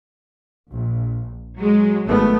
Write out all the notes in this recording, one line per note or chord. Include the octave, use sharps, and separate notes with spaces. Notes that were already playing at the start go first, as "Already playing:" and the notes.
A#1
F#3 G#3
G#1 A3 B3